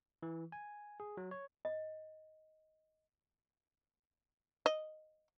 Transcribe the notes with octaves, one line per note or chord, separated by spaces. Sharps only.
E3
G#5
G#4
F#3
C#5
D#5
D#5